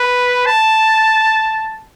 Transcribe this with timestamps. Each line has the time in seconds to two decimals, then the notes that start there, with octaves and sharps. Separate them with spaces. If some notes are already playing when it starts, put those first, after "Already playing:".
Already playing: B4
0.46 A5